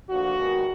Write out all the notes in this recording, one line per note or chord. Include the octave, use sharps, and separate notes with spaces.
D2 D3 F3 A#3 F#4
D#2 D#3 G#3 B3